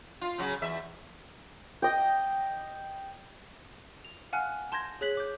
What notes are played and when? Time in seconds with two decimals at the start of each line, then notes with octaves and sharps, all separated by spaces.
0.21 F4
0.38 C#3 F#3
0.62 E2 E5
1.82 D#5 G5
4.05 F7
4.33 F5 F#5 G#5 A5 F6 F#6
4.72 A5 C6 G6 G#6 A#6
5.01 G#4 C#5 F#6 B6 F#7
5.17 D6 G6